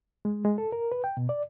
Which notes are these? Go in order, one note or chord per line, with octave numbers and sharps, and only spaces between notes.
G#3
G#3
A4
A#4
B4
G5
B2
D5